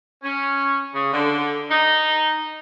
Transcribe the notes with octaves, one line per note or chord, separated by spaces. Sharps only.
C#4
C#3
D3
D#4